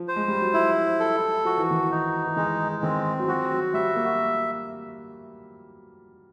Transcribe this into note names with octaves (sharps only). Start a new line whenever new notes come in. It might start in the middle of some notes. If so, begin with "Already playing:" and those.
Already playing: F3
C5
G#3
G3
F#3
F3 E4
A4
F3 F#4
E3
D#3
E3
D#4
E3
D#3 G#3
D#3 C4
F#3
F3 F#4
F#3
G3 E5
A#3